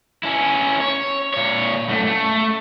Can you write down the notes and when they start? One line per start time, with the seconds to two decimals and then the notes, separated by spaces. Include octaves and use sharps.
0.23 C#4 E4
0.80 C#5
1.34 A#2 C#5
1.89 F#2 A3
2.07 A3